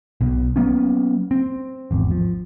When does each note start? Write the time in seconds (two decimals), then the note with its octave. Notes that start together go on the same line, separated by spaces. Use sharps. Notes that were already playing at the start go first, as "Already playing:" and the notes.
0.21 B1 B2
0.56 F#3 A#3 B3 C#4
1.31 C4
1.91 G#1 E2
2.11 F3